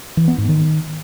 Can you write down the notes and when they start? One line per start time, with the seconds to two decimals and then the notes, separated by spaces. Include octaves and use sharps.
0.17 E3
0.28 B3
0.38 G#2
0.49 D#3